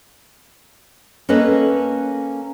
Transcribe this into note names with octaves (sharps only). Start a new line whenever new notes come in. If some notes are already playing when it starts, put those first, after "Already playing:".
A#3 C#4 A4 B4 D#5